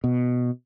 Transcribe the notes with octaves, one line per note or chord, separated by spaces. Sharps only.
B2